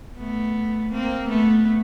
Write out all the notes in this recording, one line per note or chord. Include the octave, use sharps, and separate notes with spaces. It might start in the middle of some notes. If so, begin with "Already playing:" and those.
A3 B3
A#3 C4
A3 B3